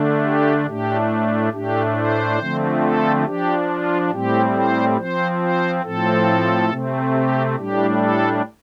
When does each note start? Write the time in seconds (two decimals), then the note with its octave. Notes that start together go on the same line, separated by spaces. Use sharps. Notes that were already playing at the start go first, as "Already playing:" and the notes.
Already playing: D3 A3 D4
0.23 G4
0.67 A2 A3 D4 G4
1.52 A2 A3 D4 G4
1.96 C5
2.39 D3 F3 A3 C4
2.82 A4
3.25 F3 D4 G4
3.68 F4
4.11 A2 G3 C4 G4
4.55 C5
4.97 F3 C4 C5
5.41 C5
5.83 A2 F3 C4 A4
6.69 C3 A3 C4
7.13 G4
7.55 A2 G3 D4 G4
7.99 A4